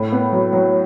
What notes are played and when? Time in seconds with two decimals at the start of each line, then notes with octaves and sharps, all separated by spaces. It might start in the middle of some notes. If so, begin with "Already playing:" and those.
Already playing: A2
0.12 B3
0.32 F#3
0.53 F#3